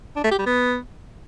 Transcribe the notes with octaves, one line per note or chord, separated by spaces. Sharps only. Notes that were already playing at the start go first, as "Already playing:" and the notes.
D4
A3
G4
G3
B3